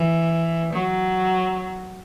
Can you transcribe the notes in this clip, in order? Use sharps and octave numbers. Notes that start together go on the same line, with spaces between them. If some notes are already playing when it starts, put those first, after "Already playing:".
Already playing: E3
F#3